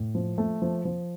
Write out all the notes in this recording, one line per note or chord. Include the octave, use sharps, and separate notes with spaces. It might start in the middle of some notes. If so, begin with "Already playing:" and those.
Already playing: A2
F3
A3
F3
F3